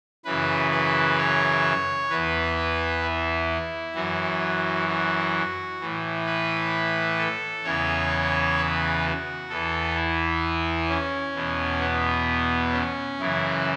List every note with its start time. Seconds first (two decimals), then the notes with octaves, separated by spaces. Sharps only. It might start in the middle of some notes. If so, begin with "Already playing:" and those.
0.25 F#2 C#3 E3 B4
0.71 B4
1.18 C#5
2.09 E2 E3 B4
3.02 E4
3.94 F#2 E3 F#4
4.88 F#4
5.80 A2 E3
6.26 B4
7.18 A4
7.64 E2 C#3 E3 C#5
8.57 B4
9.04 F#4
9.50 E2 E3 A4
9.96 E4
10.89 C#4
11.35 E2 B2
11.81 B3
12.73 C#4
13.19 F#2 C#3 E3 E4